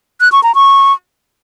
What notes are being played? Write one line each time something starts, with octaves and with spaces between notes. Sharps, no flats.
F#6
C#6
A#5
C#6